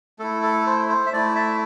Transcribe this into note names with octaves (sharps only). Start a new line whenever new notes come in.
A3 E4 A4
A4
C5
C5
E5
A3 E4 D5
E5